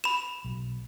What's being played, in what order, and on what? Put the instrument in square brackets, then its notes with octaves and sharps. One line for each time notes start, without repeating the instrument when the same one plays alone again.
[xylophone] B5 E7
[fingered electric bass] B1